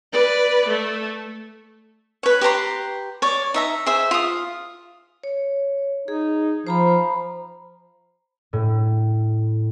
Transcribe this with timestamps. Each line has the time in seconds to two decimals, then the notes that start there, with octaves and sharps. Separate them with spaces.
0.13 B4 D5
0.69 A3
2.23 B4 C#5
2.41 G4 B4 A#5 C6
3.22 C#5 D5
3.54 D#4 E5 A#5
3.86 G#4 C5 E5
4.11 F4 D#6
5.24 C#5
6.08 D#4 G#4
6.67 F3 C5 A#5 B5
8.53 A2